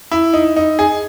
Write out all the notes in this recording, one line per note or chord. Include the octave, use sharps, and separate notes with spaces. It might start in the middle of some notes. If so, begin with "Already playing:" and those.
E4
D#4
D#4
G#4